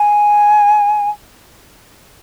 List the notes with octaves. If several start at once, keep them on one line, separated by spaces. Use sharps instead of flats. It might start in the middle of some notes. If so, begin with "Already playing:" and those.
Already playing: G#5